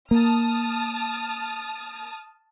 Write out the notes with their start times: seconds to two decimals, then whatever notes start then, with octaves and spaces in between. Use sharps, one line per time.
0.11 A#3 A5 D#6 F6